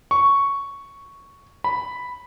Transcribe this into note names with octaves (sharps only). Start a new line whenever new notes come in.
C#6
B5